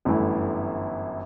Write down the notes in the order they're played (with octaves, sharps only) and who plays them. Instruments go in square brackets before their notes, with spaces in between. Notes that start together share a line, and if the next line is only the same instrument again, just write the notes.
[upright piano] G1 F#2 E3 A3 E4